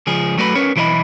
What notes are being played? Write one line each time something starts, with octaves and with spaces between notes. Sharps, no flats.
C#2 F3 G#4
F#3 A3 F#4 B4 C5 B5
C#4 A#4 B4 C#5
B1 E3 E4 C5 D#5 B5